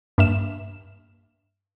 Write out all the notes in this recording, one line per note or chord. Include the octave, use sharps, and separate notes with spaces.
G2 A#3 E5 F6 E7